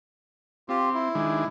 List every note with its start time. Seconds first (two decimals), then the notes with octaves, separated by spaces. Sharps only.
0.69 C4 F4 G4
0.94 E4
1.15 D#3 G#3 D4